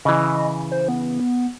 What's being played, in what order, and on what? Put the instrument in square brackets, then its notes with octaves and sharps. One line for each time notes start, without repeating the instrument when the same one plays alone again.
[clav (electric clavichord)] C#3 E3 [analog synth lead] D#5
[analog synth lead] C5
B3